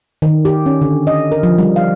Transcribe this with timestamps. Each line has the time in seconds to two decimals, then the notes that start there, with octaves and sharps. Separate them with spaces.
0.22 D#3
0.45 G4
0.66 C#4
0.82 D3
1.07 D#5
1.32 A#4
1.43 F3
1.58 G3
1.76 F5